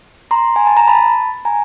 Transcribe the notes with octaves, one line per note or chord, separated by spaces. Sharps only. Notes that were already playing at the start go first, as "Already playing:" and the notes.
A#5 C6
G#5
A5
A#5
A5 B5
G#5 A#5